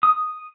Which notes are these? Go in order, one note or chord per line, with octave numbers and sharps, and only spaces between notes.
D#6